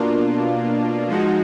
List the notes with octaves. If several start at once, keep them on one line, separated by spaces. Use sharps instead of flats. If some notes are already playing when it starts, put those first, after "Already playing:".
Already playing: B2 A#3 D4 F4
F3 G#3 D#4 F#4